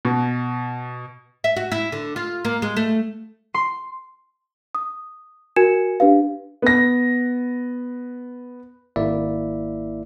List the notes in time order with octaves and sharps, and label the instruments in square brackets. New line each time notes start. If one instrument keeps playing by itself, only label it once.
[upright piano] B2
[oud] E5
F#4
E4
D3
F4
A#3
G#3
A3
[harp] C6
[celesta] D#6
F#4 A#4 G#5 G#6 C#7 E7
D4 G4 B4 F5
[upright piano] B3 A#6
[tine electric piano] G#1 A#3 E4 D5 E5